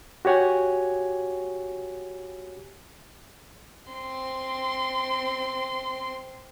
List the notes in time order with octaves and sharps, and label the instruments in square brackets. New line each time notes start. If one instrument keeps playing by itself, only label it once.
[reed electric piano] F#4 G4 C#5 F#5 G#5
[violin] C4 C6